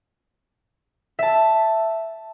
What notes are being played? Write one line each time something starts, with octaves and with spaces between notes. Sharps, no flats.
E5 A5